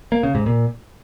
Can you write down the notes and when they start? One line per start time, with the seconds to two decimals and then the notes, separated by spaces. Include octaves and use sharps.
0.12 A#3
0.23 C#3
0.35 G#2
0.46 A#2